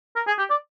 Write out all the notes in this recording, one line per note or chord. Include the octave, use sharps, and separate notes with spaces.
A#4
G#4
G4
D5